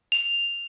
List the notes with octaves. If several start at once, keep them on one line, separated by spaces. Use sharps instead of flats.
F7